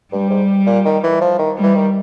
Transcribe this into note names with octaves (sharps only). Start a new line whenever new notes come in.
G2 G3
G#2
A#2
D#3
E3
F3
D#3
G3
E3
D#3